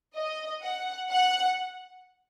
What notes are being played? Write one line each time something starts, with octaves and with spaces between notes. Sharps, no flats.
D#5
F#5
F#5